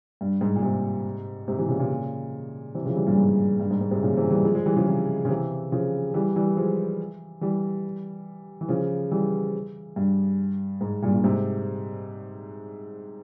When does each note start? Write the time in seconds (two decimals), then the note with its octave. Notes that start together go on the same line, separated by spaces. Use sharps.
0.21 G2
0.41 G#2
0.56 A#2
0.62 G#2 C3
1.48 G#2 C3
1.58 C3 E3
1.68 A#2 C#3
1.79 A#2 C#3
2.74 C3 E3
2.85 C#3 F3
2.96 E3 G3
3.06 G2 A#2
3.18 G#2
3.60 G2
3.71 G#2
3.81 G#2
3.91 G#2 C3
4.02 A#2 C#3
4.16 C3 E3
4.31 E3 G3
4.45 F3 G#3
4.55 F3 G#3
4.66 E3 G3
4.77 C#3 F3
4.87 C3 E3
5.25 C#3
5.29 C3 E3
5.72 C#3 F3
6.14 E3 G3
6.36 E3 G3
6.57 F3 G#3
7.41 E3 G3
8.61 E3
8.69 C#3 F3
9.11 E3 G3
9.96 G2
10.81 G#2
11.03 G2 A#2
11.13 G2 A#2
11.24 G#2 C3